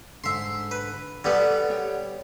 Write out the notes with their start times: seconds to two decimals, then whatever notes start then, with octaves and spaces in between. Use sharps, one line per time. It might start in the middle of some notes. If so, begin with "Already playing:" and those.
0.24 G#2 D3 E5 C6
0.71 B4
1.24 D3 G3 B3 A4 B4 D5
1.70 G4 C#5